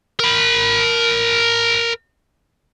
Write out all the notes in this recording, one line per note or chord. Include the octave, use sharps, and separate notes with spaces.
A#4 B5